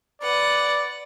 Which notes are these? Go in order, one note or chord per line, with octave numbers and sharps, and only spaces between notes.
B4 D5 F#5